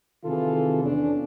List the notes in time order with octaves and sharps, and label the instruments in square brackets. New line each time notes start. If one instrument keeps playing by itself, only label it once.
[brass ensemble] C3 D#3 E3 F4 G#4 A4
E2 C#4 D4